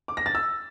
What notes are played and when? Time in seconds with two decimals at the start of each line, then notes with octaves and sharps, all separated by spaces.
0.08 D6
0.17 A#6
0.26 A6
0.35 E6